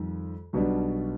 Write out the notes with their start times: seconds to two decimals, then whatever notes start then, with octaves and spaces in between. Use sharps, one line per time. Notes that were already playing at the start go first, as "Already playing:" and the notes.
Already playing: F2 D#3 G3
0.53 B1 B2 G3 D4